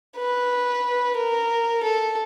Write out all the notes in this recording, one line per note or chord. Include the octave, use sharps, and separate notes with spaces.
B4
A#4
A4